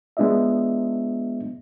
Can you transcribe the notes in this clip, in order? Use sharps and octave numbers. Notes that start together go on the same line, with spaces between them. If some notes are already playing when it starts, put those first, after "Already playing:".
G#3 B3 D4 F4 D#5 E5